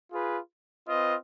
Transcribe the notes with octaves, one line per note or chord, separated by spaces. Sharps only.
F4 G#4 B4
C4 F4 B4 D#5